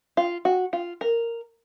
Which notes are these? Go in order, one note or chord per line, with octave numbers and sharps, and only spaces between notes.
F4
F#4
F4
A#4